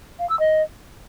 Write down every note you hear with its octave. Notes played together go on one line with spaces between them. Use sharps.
F5
E6
D#5